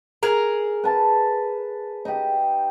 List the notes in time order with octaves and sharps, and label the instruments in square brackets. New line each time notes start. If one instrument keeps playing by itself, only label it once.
[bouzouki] G#4 A#4
[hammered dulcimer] B4 A5
D#4 G4